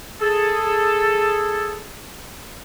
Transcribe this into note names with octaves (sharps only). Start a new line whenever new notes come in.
G#4 A4